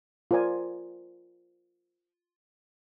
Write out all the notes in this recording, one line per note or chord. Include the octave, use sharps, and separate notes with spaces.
F4 A#4 C5 D5 G#5